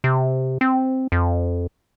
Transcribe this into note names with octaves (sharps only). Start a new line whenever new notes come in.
C3
C4
F2